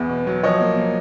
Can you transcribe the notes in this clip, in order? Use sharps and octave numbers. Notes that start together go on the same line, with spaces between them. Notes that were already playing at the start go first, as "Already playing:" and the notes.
Already playing: E2 B3
B2
F#3
F3 C#5 D#5
A#3
A#3